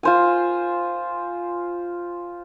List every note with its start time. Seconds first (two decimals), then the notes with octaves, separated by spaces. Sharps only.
0.03 F4 C5 G#5